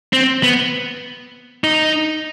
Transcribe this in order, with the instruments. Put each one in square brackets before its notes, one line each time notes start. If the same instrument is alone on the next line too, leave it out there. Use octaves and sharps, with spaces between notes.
[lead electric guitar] C4
B3
D#4